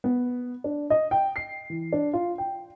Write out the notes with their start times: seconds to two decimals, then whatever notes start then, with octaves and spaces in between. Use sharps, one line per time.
0.04 B3
0.64 D4
0.90 D#5
1.11 G5
1.36 C7
1.70 E3
1.93 D4
2.13 F4
2.38 G5